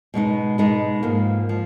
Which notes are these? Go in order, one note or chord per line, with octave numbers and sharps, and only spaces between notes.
B2 G#3 B3 D#4
B2 G#3 B3 D#4
G#2 F3 A#3
F3